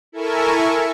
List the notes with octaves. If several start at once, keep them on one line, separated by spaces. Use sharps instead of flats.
E4 A4 A#4 E5 G#5 C#6